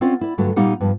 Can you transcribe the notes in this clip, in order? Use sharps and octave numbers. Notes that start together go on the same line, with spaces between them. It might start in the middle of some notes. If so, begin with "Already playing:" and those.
C4 C#4 F4 D5 E5 F#5
E4 D5
G2 D3 F#3 A3 F#4
A#2 G3 A#3 D#4 G4 F#5
G2 F3